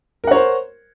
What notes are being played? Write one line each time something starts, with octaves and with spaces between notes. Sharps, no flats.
A#4 C5 C#5 F#5